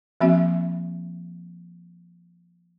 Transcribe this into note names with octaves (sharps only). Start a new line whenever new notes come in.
F3 A#3 C4 F#4 E5